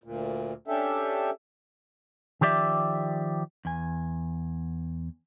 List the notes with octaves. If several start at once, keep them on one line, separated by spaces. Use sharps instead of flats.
D2 A#2
C#4 D4 G4 A4 E5
D#3 F3 G4 D5 E5
E2 G#5